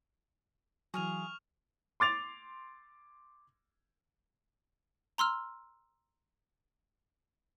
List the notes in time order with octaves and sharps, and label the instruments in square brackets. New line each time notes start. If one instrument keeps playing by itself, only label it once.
[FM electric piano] E3 F#3 [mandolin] G#4 F5 [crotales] C#6 F6 F7
[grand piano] C6 D6 A6 F7
[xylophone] A#5 C6 E6 F6